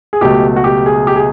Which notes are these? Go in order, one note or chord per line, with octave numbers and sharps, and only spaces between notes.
G#4
C#2 B2 F#3 A3 G4
F#4
G4
G#4
G4
G#4